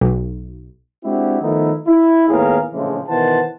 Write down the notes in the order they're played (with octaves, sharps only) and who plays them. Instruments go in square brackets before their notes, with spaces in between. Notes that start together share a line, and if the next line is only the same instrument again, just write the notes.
[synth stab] B1
[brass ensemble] G#3 C4 D4 E4 F#4 G4
D#3 F3 A3 B3 D#4 E4
E4
D#2 A2 B3 G#4 A#4 F5
A#1 A2 C#3 E3 F3 G#3
B2 D#3 E3 C5 F#5 A5